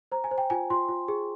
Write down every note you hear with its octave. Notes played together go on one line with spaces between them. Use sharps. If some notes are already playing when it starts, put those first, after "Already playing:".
C5 A#5
G#5
C5
G5
F4 G#5
F4 C6
F4
G#4